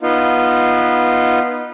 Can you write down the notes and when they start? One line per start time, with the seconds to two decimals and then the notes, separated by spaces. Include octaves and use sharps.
0.01 B3 D#4 F4